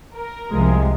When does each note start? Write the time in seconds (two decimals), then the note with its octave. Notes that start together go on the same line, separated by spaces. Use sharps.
0.14 A#4
0.52 C2 C3 F3 G#3